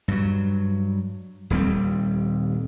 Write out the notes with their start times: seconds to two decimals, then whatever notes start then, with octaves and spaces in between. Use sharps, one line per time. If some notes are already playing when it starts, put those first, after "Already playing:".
0.08 G2 F#3
1.50 D#1 D#2 G3 C4